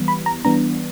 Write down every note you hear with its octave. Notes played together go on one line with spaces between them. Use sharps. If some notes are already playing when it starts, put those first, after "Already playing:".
Already playing: E3 G3 B3
B5
A#5
E3 G3 B3 D4 A#5